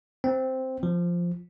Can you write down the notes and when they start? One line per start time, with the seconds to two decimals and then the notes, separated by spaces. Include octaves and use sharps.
0.24 C4
0.83 F3